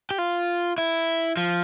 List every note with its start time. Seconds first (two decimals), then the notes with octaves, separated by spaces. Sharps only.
0.11 G4
0.18 F4
0.78 E4
1.37 F3